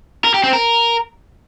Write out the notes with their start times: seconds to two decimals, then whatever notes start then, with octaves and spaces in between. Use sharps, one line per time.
0.24 A#4
0.34 G4
0.44 C4
0.53 A#4